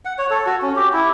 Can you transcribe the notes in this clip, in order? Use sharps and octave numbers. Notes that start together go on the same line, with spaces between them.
F#5
C#5
A4
F#4
C#4
G4
E4